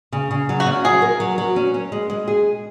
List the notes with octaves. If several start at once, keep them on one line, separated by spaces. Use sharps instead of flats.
C#3
C#3
F#3
F#4
C#4
F#4 G#4
A#4
F#3
F#3
C#4
C#4
G#3
G#3
G#4